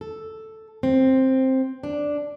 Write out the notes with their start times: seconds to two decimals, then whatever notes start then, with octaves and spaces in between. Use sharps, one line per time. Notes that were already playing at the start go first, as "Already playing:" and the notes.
0.01 A4
0.83 C4
1.83 D4